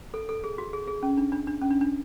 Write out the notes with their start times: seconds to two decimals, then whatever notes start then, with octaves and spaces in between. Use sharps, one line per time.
0.14 A4
0.29 A4
0.44 G#4
0.58 F#4
0.73 G#4
0.87 G#4
1.03 C#4
1.17 D4
1.32 D4
1.47 D4
1.61 C#4
1.71 D4
1.81 D4